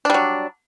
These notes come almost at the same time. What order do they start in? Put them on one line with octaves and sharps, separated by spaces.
D4 G3 F#3